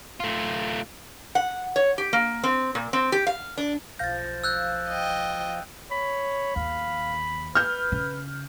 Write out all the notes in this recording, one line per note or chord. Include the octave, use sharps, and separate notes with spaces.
A3 F4
F#5
C#5
G4
A#3
C4
A#2
C4
G4
F5
D4
B1 F3 F5 G6 A6 A#6
E6 F#6 G6
D#5 G5
C#5 B5
D#2 F5
B4 F6 G6
C#3